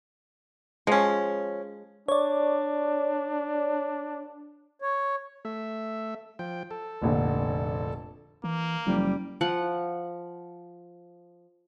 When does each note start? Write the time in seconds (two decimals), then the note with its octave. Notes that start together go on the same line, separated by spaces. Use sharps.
0.87 F3 G#3 C#4
2.08 D4 C#5 D5
4.82 C#5
5.45 A3 E5
6.39 F3 G5
6.71 A4
7.02 F1 A#1 D3
8.44 E3 A#3
8.87 F#1 F3 G3
9.41 F3 F#5